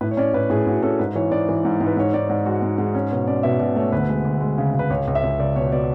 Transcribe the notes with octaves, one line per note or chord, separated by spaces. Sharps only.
A2 B4
C#5
C#4 D5
A2 B4
A2 G#4
A2 F#4
C#4 A4
G#2 B4
E3 C#5
G#2 D5
E3
G#2
G#2
B4
G#2 C#5
G#2 D5
G#2 D5
G#3 F#4
G#2
G#2 G#4
C#4
B2 C#5
C#4 D5
B2 E5
B2 D5
A3 C#5
D2 B4
G#3
D2
G#3
C#3
C#3
B4
C#2 C#5
C#2
E5
C#2
C#2 D5
B2 C#5
B2 D5